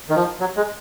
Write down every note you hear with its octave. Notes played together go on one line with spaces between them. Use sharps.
D#3
F3
F#3
G#3